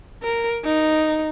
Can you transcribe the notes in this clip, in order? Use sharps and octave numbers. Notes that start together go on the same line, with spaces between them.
A#4
D#4